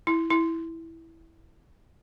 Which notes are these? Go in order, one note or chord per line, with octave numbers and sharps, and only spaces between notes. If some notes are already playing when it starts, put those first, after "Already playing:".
E4
E4